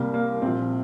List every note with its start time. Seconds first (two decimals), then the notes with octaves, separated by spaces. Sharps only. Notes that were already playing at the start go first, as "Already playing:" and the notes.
Already playing: C2 C3 G3 A#3
0.14 A#3
0.42 A#1 A#2 F3 C4